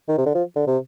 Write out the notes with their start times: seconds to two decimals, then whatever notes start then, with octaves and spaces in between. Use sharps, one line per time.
0.09 D#3
0.18 C3
0.26 D3
0.35 F3
0.56 D3
0.67 C3